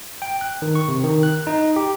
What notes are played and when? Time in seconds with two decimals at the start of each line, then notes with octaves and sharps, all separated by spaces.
0.22 G5
0.41 F#6
0.62 D#3
0.75 C#6
0.88 C3
1.04 D#3
1.23 F#6
1.47 D#4
1.76 G4